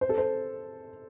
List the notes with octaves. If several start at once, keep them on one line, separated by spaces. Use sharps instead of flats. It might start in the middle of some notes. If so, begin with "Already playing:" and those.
C5
A4
C5